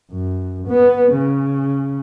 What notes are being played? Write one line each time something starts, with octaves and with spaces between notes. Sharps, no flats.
F#2
B3
C#3